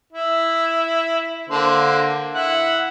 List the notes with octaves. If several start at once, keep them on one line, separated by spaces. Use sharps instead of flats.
E4
D3 A#3 C5
E4 F#5